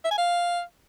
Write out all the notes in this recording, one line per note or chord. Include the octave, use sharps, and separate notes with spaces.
E5
G#5
F5